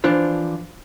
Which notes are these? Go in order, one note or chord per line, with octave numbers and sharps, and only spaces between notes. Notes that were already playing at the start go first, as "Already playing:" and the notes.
E3 F3 D4 F4 C5